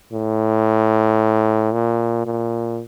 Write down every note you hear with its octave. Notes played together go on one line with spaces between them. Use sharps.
A2
A#2
A#2